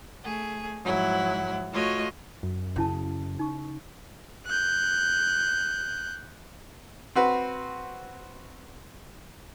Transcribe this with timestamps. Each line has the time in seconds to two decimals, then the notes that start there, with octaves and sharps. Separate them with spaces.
0.22 A3 G#4
0.84 G#2 F3 F#3 E4 F#5
1.72 A3 F4 F#4 C#5 D#5
2.43 F#2
2.76 C#3 C#4 E4 A5
3.39 D#4 C#6
4.46 F#6 G6
7.15 C4 F#4 B4